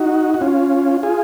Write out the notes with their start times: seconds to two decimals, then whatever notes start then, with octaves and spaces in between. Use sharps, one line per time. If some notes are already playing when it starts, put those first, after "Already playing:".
Already playing: D#4 F#4
0.34 F#4
0.41 C#4 F4
1.03 F4 G#4